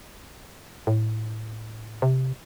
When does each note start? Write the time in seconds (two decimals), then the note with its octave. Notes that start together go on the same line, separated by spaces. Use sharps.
0.87 A2
2.02 C3